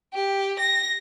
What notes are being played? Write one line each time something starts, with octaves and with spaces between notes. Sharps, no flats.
G4
A#6